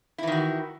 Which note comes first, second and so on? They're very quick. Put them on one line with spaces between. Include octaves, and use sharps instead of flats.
E4 E3 D#3 F#4